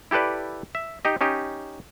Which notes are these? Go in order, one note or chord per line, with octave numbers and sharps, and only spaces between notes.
E4 G4 A4 B4 D5
E5
D#4 G4 D#5
C#4 D#4 G4